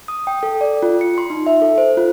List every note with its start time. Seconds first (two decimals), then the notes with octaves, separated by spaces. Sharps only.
0.08 D#6
0.27 G5
0.43 A4
0.61 D5
0.83 F4
1.01 C#7
1.18 C6
1.30 D#4
1.47 E5
1.62 A4
1.78 C5
1.97 F4